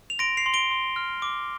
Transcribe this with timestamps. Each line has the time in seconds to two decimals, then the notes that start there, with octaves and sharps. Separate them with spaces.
0.10 F7
0.19 C6 A#6 D7
0.37 C7 F7
0.46 C6
0.54 D7 G7
0.71 C6
0.96 F6
1.22 D6